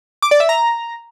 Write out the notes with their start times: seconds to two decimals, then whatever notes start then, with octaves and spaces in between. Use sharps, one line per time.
0.22 D6
0.31 D5
0.40 E5
0.49 A#5